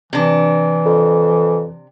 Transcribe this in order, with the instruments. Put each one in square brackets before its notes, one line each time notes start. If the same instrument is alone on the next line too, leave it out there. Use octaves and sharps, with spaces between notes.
[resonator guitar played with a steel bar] C3 D4 [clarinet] E3
[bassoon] F2